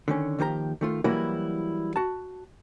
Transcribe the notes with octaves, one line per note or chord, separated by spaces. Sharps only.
D3 D#3 C#4
D#2 D#3 F3 G4 C#5 A#5
D#3 A3 F4
E3 F#3 G3 A#3 E4 F#4
F#4 A5